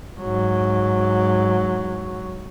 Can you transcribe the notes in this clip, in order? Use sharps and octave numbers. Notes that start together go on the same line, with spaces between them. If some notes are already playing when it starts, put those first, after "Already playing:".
G#2 F#3